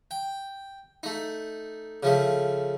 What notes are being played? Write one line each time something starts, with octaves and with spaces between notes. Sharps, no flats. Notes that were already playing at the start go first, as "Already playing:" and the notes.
G5
A3 D#4
C#3 F3 A3